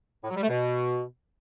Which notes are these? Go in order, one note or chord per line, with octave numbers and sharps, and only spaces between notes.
A2
F#3
G3
A3
B2